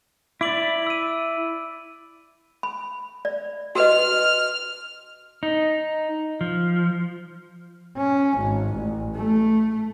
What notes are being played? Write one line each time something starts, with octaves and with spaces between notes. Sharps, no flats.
E4 D5 D6 D7 F#7
E6 D#7
B5
D5
F#4 B4 D#5 F6
D#4
F3
C#4
G#1
A1
A3